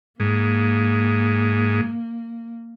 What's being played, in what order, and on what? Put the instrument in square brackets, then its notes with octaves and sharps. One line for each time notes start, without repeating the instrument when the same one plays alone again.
[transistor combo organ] G#2 [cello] A#3